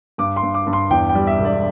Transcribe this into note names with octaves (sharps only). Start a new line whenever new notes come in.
G2 D6
C6
G2
D6
G2
C6
E2 G5
G5
G3
E5
E1
D5